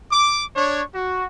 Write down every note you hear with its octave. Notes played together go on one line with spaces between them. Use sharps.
D6
D4 C#5
F#4